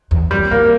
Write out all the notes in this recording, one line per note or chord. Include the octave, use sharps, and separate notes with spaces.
E2
F2 G3
G2 A#3